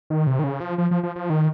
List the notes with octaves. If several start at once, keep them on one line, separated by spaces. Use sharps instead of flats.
D#3
C3
D#3
C#3
F3
F3
F3
F3
F3
D#3